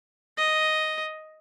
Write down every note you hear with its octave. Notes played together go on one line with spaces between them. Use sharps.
D#5